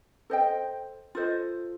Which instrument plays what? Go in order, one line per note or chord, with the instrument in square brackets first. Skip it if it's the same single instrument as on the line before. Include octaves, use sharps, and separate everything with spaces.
[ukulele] A4 C5 D#5 G5
F4 A4 C5 D#5